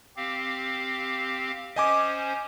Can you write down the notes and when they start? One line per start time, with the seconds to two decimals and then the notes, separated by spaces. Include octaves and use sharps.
0.17 C4 G4 F5
1.76 C#4 C5 D#5 G#5 D6